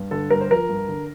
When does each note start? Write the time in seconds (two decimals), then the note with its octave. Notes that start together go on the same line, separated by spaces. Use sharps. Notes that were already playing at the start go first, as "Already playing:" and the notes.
Already playing: G2
0.11 D3 A4
0.30 G2 A#4
0.41 C5
0.50 F3 A#4
0.69 G2
0.88 D3